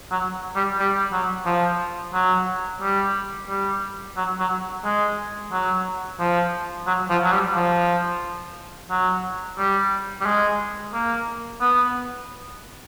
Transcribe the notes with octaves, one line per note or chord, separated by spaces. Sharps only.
F#3
G3
G3
F#3
F3
F#3
G3
G3
F#3
F#3
G#3
F#3
F3
F#3
F3
F#3
G3
F3
F#3
G3
G3
G#3
A#3
B3